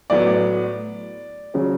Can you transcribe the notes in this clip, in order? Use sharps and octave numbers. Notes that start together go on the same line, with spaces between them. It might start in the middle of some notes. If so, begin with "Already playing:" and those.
A2 F#3 B3 D5
C#3 F#3 C#4